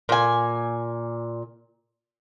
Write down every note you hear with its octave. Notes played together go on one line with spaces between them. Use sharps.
A#2 G#5